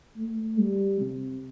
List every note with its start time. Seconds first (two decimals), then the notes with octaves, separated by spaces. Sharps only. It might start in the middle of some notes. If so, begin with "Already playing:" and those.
0.18 A3
0.60 G3
1.01 C3